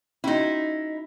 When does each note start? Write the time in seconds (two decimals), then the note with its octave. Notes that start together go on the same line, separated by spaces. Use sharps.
0.24 C#4 D#4 E4 F#4